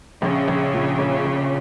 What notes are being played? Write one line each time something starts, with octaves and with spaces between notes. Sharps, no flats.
A#1 C#3
A#1
A#2
A#1
A#1